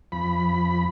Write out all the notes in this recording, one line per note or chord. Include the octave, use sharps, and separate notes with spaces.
F2 B5